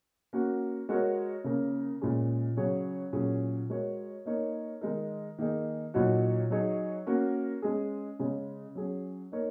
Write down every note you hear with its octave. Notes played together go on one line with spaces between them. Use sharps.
A#3 C#4 F#4
G#3 F#4 A#4 C#5
C#3 A#3 C#4 A#4
A#2 G#3 C#4 G#4
C#3 F#3 C#4 G#4 C#5
A#2 F#3 C#4 G#4
G#3 F#4 A#4 C#5
A#3 D#4 A#4 C#5
D#3 G#3 D#4 A#4
D#3 A#3 D#4 G#4
A#2 F#3 D#4 F#4 C#5
F#3 D#4 G#4 C#5
A#3 C#4 F#4 A#4
G#3 C#4 G#4
C#3 G#3 C#4
F#3 C#4 G#4
A#3 D#4 A#4 C#5